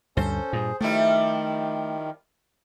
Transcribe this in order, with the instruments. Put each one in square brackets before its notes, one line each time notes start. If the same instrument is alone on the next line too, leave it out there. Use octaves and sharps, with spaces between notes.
[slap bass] D2 G2 [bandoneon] C#4 A4 [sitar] C5
[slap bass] G2 A#2 [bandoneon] G#4
[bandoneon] D#3 [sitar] F3 G3 E4 [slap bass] A3